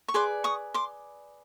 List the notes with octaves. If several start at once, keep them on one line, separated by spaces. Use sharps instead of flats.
C#6
G#4 B4 D5 C6 D6
C#6 D#6
C6 D6